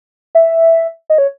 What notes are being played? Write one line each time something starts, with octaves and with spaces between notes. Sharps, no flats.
E5
D#5
C#5